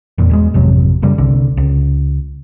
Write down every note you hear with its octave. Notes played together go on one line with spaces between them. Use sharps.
F1 E2 A#2
E2 G#3
G#1 F2 C3 F#3
F#1 F#2 C#3 G3
C2 D3
C#2